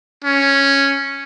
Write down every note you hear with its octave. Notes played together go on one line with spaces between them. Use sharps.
C#4